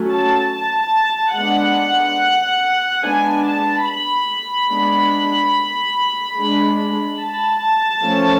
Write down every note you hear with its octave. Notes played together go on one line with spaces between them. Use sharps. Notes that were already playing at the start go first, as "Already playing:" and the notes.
Already playing: F#3 A3 C#4
A5
A5
G#3 B3 D4 F#5
G#3 B3 D4 G#5
A5
B5
G#3 B3 D4
G#3 D4
A5
F3 A3 C#4